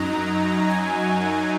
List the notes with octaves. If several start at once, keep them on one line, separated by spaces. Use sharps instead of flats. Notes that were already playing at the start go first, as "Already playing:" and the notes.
Already playing: F#2 F#3 D#4 A#5
G#5